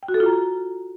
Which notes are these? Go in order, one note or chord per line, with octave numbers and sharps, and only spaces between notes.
G5
F#4
A4
F4
A#5